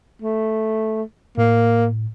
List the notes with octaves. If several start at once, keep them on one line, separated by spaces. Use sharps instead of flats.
A3
A2 A#3